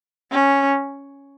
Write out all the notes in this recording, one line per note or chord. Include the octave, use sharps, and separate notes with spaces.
C#4